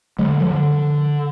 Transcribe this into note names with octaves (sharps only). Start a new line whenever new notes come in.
D3 F#3 G#3
F3 G3
D3